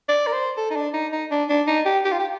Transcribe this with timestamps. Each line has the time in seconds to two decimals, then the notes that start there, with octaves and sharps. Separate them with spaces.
0.09 D5
0.27 A#4
0.33 C5
0.57 A4
0.71 D#4
0.76 D4
0.94 D#4
1.12 D#4
1.31 D4
1.49 D4
1.67 D#4
1.86 G4
2.05 G4
2.12 F4
2.20 G4